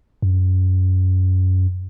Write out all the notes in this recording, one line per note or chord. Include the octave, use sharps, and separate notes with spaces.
F#2